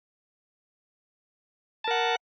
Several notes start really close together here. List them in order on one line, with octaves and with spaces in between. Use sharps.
A5 A#4 F#5